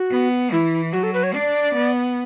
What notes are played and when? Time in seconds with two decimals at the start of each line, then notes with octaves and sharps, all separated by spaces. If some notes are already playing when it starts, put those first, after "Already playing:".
Already playing: F#4
0.11 B3
0.52 E3 E4
0.93 F#3 F#4
1.03 A4
1.14 B4
1.23 C#5
1.34 D4 D5
1.75 B3